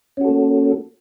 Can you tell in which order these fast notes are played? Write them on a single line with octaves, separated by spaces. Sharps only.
C#4 F#4 A4 A#3